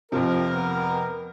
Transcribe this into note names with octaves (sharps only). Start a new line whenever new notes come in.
F2 C3 F3 A#4
B3